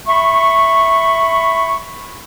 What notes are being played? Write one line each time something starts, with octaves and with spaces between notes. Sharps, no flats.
E5 B5 C#6